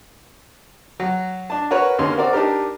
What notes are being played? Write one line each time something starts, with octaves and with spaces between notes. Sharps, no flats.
F#3
D4 A5
F#4 A#4 B4 C#5
D#2 D3 A#3 C#4 C6
C4 F#4 A#4 D5
D4 D#4 G4 A#4